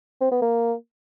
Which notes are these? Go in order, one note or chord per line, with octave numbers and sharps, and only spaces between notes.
C4
B3
A#3